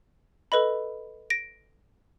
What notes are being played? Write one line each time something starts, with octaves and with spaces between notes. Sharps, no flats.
A4 B4 D#5 B5
A#6 D7